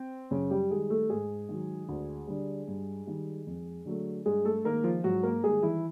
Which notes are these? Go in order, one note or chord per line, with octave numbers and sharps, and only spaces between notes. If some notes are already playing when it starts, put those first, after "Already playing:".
Already playing: C4
F#2 C#3 C#4
G3 G4
D#3 G3 G#3 G#4
A3 A4
G#2 G#3 G#4
D#3 F#3
D2
D3 G3
G2
D#3 G3
F2
D3 F#3 A3
G2 G#3 G#4
A3 A4
D#3 G#3 A#3 A#4
F3 F4
G#2 F#3 F#4
A#3 A#4
D#3 G3 G#3 G#4
E3 E4